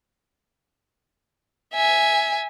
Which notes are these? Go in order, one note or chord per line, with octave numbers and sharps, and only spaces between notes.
E5 G#5